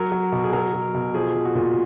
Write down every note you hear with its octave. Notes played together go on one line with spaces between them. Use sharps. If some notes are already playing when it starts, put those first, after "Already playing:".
Already playing: F#3 A#4
F#3
B2
G#4
F#3 A#4
F#3
B2
F3 G#4
F3
F#4
A#2